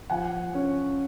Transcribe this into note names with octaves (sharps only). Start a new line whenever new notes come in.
F3 F#5 G#5
C#4